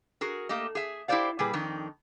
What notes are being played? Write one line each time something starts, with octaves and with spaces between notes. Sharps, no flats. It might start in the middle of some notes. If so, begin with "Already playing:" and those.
F#4 G#4 A#4
A3 A#3 G4 D#5
G#4 E5
E4 G4 A#4 C5 D5 F5
A#2 G3 G#4 B4
F2 D#3 D4 D#4